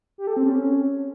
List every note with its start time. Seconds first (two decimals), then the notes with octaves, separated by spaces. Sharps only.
0.18 G4
0.27 A4
0.37 C4
0.46 C#4